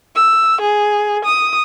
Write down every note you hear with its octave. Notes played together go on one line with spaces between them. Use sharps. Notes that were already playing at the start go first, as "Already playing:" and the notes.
E6
G#4
D#6